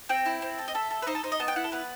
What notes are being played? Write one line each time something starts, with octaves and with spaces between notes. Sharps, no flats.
C4 G5
E4
C4
A4
D#5
A4 E5
A4
B4
D#4 C5
A4
D#4 C5
D#5
B3 A5
G5
E4 F#5
A4
B3 B4